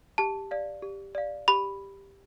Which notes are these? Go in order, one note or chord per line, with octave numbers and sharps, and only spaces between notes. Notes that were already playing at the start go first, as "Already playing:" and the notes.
G4 A5
D5 F5
G4
D5 F5
G4 B5